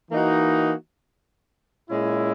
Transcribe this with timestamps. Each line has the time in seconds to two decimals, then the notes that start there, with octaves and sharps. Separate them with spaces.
0.11 E3 A#3 D#4 F#4
1.89 A#2 G#3 C#4 E4